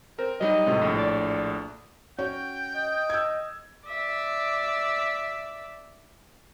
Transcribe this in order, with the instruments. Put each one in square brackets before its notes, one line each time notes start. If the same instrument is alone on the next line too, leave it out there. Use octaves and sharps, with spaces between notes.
[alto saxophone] C4 [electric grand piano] A#4
[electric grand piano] F#3 G3 D#4 [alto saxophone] D#5
[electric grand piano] A2 C3 G#3
A#1 A2
[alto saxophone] D5
[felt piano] C#4 F#4 C#5 [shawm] G5
[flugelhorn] D#5
[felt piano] E6 G#6
[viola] D5 E5